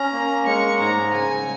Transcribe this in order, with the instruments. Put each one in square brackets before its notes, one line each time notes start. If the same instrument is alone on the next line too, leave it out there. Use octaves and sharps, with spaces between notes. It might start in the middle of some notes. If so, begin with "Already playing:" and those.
Already playing: [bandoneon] C#4 [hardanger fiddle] A#5
[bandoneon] A#3
[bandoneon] G#3 [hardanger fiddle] C#6
[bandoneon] G#2 [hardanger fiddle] A#5
[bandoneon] C#3 [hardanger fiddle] G#5